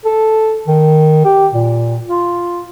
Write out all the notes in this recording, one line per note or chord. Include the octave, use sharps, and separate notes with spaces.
A4
D#3
G4
A#2
F4